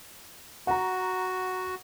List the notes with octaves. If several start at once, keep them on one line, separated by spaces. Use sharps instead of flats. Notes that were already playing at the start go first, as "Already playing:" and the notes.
F#4 F#5 A#5